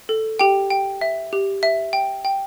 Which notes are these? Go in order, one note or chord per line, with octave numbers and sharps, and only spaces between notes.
A4
G4 G5
G5
E5
G4
E5
G5
G5